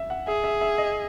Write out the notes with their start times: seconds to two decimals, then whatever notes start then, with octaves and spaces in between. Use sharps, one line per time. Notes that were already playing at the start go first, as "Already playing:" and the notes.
Already playing: E5
0.10 F#5
0.27 G#4 E5
0.44 E5
0.61 E5
0.78 D#5